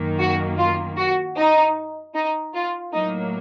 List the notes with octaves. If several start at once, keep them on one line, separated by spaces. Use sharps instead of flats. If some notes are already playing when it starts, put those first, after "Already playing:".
Already playing: F#2 D#3 A#3
F#4
F4
F#4
D#4
D#4
F4
A2 F#3 A#3 D#4